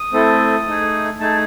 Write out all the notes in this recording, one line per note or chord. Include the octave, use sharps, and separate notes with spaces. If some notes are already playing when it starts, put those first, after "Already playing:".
Already playing: D#6
A3 C4 E4 A4
A3 D#4 G#4
A3 D#4 G#4 A5